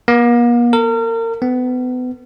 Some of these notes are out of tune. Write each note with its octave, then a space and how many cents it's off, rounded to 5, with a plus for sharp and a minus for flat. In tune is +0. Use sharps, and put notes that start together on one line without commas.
A#3 +45
A#4 -35
B3 +30